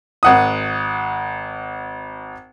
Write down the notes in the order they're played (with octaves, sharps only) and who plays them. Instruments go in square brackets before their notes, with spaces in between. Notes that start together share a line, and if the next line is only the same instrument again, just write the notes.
[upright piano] G#1 F#5 D#6